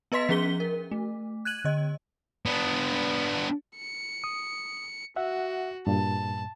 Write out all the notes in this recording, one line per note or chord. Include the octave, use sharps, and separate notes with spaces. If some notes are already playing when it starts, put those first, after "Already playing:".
B3 B4 D#5 C6 B6
F3 C#4 G#4 B6 G7
A#4
A3
F#6 G#6 D#7 F#7
D3 D#5
B3 D4
C#7
D#6
F#4 E5 F#5
G2 A#2 A5